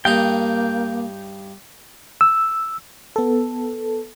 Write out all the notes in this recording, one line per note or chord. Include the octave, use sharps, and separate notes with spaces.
G2 A#3 D#4 G5 A#5
E6
B3 A4